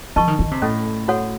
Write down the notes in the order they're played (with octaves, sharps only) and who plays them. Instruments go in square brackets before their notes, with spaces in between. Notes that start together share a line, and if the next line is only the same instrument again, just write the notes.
[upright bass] F3 [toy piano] A#4 D#5 A5 C#6
[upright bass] D#3
D#3
C3
[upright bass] A2 [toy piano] C#4 A4 D#5
[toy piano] F#4 A4 C#5 F#5